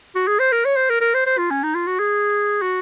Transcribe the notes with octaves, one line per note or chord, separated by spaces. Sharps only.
F#4
G#4
C5
A#4
C#5
C5
A#4
A#4
C5
C5
F4
C#4
D#4
F4
F#4
G#4
F#4